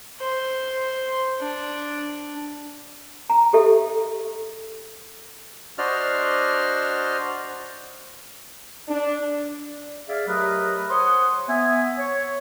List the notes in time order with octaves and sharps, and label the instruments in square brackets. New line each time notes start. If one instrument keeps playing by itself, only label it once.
[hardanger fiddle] C5
D4
[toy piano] A#5
G4 A4 E5
[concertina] D4 F#4 C5 D5 D#5 F6
[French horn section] D4
[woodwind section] G#4 D5 E5 F5
F#3 A3 G4 A#4 B4 D#5
C5 C#5 F#5 C6 D#6
B3 E5 G#5
C#5